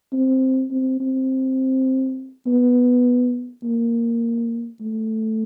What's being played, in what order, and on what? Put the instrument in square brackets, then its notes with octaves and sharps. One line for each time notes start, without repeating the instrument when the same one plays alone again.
[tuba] C4
C4
C4
B3
A#3
A3